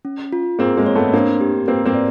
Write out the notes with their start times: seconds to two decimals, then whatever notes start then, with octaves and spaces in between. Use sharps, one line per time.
0.05 C#4
0.32 F4
0.59 A#3 C4 G#4
0.77 G#3 A#3
0.86 C#5
0.95 A3 B3
1.13 A#3 C4 D4
1.41 G4
1.68 A#3 C4 B4
1.85 A#3 C4
1.94 D5